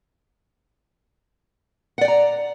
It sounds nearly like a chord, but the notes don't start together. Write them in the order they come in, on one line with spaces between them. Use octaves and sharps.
F#5 D5 G5 A#5